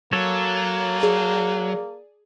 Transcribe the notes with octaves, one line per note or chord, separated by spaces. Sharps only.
F#3 A#3 A4 C#5
G#4 D5 A5